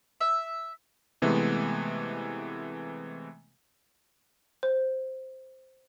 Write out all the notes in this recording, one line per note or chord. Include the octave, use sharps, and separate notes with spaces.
E5
C3 E3 G#3 A3 B3
C5